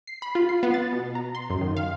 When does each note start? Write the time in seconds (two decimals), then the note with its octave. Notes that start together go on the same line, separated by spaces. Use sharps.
0.07 C7
0.22 B5
0.35 F4
0.49 C7
0.63 B3
0.74 A6
0.93 B2
1.15 A#5
1.35 C6
1.50 F#2
1.61 D#3
1.77 F5